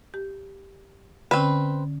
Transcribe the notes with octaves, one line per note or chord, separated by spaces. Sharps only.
G4
D3 C4 C#4 B4